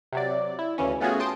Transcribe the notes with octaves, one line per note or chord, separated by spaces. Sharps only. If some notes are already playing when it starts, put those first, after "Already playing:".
C3 F#3 D5
E4
D2 C#3 E3 C#4
A3 B3 C#4 F4 F#4 G#4
G5 A5 C6 D#6 D7